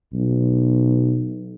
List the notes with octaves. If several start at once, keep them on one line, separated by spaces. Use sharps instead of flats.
B1